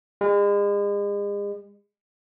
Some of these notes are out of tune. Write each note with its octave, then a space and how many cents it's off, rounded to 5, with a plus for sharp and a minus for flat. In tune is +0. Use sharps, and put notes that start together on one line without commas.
G#3 -40